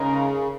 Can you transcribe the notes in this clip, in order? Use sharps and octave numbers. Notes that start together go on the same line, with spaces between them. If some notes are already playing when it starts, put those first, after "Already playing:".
Already playing: C#3 G#3 D#4 A#4